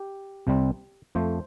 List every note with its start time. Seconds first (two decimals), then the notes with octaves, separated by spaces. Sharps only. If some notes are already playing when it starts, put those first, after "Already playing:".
Already playing: G4
0.47 C2 C3 G3 C4
1.15 F2 F3 A3 C5